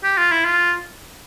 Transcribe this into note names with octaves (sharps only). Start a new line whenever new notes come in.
G4
F4
E4
F4